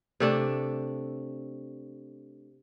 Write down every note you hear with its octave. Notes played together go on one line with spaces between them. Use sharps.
C3 A3 D4